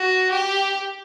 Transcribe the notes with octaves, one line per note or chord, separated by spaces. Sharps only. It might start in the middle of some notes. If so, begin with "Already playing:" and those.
Already playing: F#4
G4